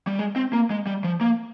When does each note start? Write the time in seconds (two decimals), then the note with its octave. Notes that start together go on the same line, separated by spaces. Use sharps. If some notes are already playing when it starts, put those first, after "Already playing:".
0.07 G3
0.19 G#3
0.36 C4
0.53 A#3
0.70 G#3
0.87 G3
1.04 F3
1.21 A#3